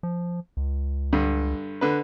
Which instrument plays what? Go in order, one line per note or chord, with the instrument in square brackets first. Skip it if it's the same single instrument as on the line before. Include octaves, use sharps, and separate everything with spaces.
[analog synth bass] F3
C#2
[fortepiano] G2 D3
D3 B4